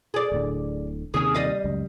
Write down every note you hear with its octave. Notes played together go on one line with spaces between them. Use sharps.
G#4 D5
D1 A2 D3
D#2 C3 D#3 C#4 G#4
G3 D#5 F5
C#2 F#2